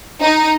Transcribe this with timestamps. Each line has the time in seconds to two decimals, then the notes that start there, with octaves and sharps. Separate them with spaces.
0.22 D#4